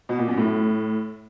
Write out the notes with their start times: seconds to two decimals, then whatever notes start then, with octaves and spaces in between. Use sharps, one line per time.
0.09 B2
0.19 A#2
0.28 F#2
0.38 A2